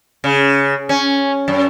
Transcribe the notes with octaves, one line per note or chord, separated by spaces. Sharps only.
C#3
C#4
F#2